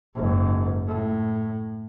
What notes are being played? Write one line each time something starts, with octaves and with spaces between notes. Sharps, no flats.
F#1 G#2
A2